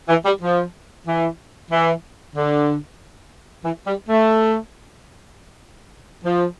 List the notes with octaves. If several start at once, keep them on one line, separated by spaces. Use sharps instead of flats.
E3
G3
F3
E3
E3
D3
E3
G3
A3
F3